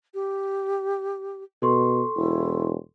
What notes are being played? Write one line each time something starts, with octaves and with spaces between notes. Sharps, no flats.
G4
B2 A4 C6 C#6
E1 E4